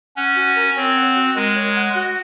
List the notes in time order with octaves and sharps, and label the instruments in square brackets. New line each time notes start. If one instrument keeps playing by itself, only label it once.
[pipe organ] C#4 [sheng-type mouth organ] F#5
[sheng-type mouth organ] F#4
A#4
[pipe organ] C4 [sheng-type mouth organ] C#5
[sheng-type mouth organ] F#5
F#4
[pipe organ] G#3 [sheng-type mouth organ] A#4
[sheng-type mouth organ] C#5
F#5
F#4